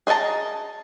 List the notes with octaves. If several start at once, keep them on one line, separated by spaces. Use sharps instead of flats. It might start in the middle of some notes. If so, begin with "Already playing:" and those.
G#4 D#5 E5 A5 A#5